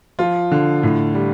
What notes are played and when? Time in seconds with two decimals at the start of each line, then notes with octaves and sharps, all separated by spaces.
0.19 F3 F4
0.51 D3
0.83 A2
1.15 G3